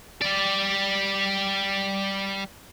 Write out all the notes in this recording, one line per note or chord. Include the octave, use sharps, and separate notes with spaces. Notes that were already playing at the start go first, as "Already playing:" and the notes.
G3 D5